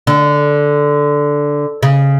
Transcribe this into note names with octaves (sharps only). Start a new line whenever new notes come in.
D3
C#3